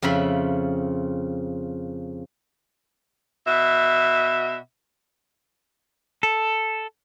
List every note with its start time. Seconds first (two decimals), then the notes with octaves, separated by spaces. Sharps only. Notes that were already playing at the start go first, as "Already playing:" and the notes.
0.02 F2 C#3 F3 E5 B5
3.45 B2 E5
6.23 A4